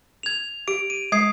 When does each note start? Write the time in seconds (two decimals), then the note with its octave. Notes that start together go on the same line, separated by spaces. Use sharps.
0.23 G#6 F7
0.68 G4 D7
0.90 D#7
1.12 G#3 D#6 G#6 C7